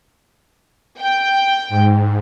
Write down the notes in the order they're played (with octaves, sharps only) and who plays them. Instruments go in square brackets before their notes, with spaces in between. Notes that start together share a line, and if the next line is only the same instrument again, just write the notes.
[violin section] G5
[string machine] G#2